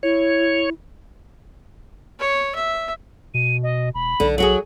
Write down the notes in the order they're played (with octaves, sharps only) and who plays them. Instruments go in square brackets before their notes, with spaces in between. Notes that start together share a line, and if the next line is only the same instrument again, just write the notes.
[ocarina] E4 [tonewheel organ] C#5
[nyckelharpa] C#5
E5
[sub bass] B2 [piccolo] D#7
[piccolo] D#5
[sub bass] E1 [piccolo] B5
[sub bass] B1 [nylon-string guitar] D3
[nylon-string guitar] F#3 F#4 G#4 [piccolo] F#7